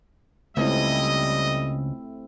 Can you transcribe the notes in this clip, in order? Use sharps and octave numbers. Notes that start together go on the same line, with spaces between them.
C#2 G3 A3 C4 E4 D#5